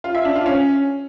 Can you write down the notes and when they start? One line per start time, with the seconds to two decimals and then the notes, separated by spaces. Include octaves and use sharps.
0.04 F4
0.15 E5
0.25 D4
0.35 F4
0.46 C#4